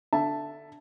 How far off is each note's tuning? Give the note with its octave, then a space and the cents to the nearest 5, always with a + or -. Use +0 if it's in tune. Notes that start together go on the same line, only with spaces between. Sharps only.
D3 +0 E5 +10 A5 +0